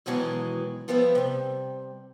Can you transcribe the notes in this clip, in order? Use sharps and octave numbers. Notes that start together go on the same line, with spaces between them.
F#2 B2 D#3 E3 F#3 G#3
F3 G3 B3 B4 E5
C3 G3